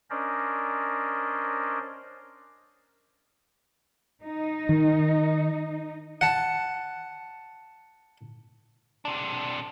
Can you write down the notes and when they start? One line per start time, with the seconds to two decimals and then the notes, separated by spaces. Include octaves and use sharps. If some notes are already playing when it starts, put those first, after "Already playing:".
0.10 C#4 D4 A#4 C5 D5 D#5
4.22 D#4
4.69 D#3
6.21 F#5 A5
9.05 C3 D4